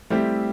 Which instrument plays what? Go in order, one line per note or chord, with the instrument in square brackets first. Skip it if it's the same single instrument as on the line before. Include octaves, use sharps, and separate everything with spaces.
[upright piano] G3 C4 E4 G4 [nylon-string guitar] A3